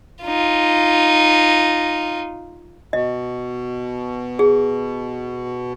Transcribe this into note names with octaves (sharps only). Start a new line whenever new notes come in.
D#4 F4
B2 D#5
G#4